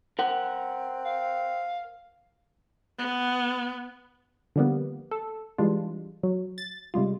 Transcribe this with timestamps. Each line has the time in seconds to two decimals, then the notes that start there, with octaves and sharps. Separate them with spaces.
0.19 C4 A#4 F#5
1.05 F5
2.98 B3
4.56 D3 F3 G3 A#3 B3
5.11 A4
5.58 E3 G3 G#3 D4 F4
6.23 F#3
6.58 A6
6.94 C3 G3 G#3 F4